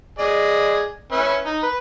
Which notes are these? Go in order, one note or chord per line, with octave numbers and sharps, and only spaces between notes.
G#4 D5 D#5
C#4 B4 E5
D#4
B4